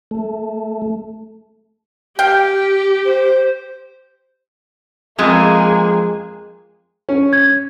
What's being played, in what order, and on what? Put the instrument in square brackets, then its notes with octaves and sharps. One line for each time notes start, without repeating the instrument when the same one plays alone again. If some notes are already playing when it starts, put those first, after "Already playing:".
[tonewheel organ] A3
[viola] G4 [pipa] F5 G5
[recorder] C5
[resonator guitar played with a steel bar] F2 G#3 [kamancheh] A#3 G#4
[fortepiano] C#4
[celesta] G#6